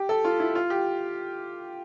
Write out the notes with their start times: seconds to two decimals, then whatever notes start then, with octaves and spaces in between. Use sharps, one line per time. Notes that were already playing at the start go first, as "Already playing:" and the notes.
Already playing: G4
0.09 A4
0.25 F4
0.40 E4
0.55 F4
0.70 G4